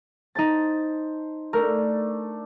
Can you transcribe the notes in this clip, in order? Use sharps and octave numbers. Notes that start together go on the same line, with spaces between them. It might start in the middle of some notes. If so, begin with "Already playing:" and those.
D#4 C5 A5 A6
A3 D4 A#4